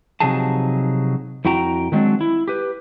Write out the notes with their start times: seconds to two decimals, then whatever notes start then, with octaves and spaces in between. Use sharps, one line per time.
0.20 C3 F3 F#3 D#4 G#4 A5
1.45 F2 E4 F#4 G5 A#5
1.92 D#3 F#3 G#3 C4 D4
2.21 E4
2.48 G4 B4